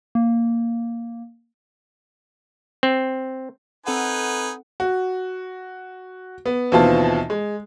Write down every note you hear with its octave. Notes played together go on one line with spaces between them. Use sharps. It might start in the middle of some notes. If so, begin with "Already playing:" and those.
A#3
C4
C4 D#4 A4 B4 F#5 G#5
F#4
B3
D#2 B2 E3 C4 F4 A5
G#3